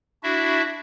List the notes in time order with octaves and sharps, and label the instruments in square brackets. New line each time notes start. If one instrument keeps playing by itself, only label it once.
[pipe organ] D4 E4 F#4 E5